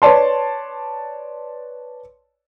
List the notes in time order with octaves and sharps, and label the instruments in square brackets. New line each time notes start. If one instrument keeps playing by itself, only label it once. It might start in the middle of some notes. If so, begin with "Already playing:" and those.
[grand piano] B4 C#5 D5 A5 C6